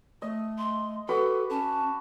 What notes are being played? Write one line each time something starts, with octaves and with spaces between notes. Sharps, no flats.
A3 D#5
C6
F#4 A4 B4 D6
C#4 A5